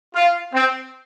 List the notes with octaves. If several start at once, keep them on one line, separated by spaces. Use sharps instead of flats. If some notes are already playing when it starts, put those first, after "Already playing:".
F4
C4